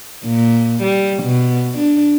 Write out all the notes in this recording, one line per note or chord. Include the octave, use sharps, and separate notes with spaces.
A#2
G3
B2
D4